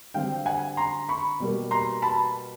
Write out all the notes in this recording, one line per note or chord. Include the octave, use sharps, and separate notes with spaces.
D3 G3 C4 F5 G5
F#5 G#5
A#5 C6
B5 C#6
B2 G3 A#3
A#5 C6
A5 B5